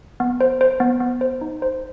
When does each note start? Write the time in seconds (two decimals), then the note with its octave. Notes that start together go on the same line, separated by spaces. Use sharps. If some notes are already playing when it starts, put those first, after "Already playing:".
0.20 B3
0.41 C5
0.61 C5
0.80 B3
1.00 B3
1.21 C5
1.41 D#4
1.62 C5